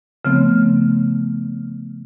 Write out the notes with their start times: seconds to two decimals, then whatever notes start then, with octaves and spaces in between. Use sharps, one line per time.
0.25 C#3 F3 A3 B3 C4